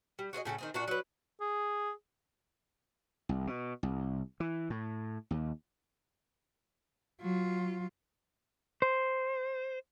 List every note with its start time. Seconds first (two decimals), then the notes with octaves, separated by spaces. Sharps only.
0.19 G3
0.33 F#4 G#4 C5 D#5
0.45 A2 C#3 G#4 A4
0.58 D#3 C4 G#4
0.74 A#2 D4 F#4
0.88 F#3 B4
1.41 G#4
3.29 C2
3.47 B2
3.83 C2
4.40 E3
4.70 A2
5.31 D#2
7.21 F#3 F4
8.82 C5